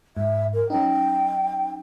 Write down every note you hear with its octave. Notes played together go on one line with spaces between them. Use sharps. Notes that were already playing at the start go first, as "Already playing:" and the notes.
G#2 E5
A#4
F#3 C#4 D#4 G5